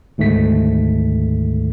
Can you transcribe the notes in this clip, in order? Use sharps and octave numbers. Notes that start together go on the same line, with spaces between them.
D2 G#2 D#3 A3 B6